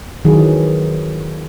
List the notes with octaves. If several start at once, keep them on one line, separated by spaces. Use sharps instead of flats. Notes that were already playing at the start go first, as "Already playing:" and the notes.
D#3 E3 F#3 G#4